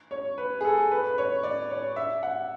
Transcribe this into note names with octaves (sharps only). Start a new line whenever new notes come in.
C#5
B4
G#4
A4
B4
B4
C#5
D5
C#5
E5
F#5